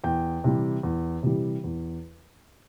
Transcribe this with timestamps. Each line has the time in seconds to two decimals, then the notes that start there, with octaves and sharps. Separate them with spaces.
0.04 E2 G5
0.44 C3 E3 G3
0.83 E2
1.23 C3 E3 G3
1.64 E2